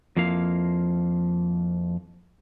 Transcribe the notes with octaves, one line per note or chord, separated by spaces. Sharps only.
F2 F3 A#3 E4 F5